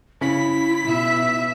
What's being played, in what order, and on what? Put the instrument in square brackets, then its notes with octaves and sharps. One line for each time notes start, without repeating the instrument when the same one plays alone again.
[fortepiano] C#3 [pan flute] E4 [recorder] B6
[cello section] B2 E5